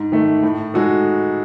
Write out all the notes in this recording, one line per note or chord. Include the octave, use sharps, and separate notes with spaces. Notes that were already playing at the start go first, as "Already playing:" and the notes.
Already playing: G#2
D#3 A3
A2
G#3 D#4 F#4 A4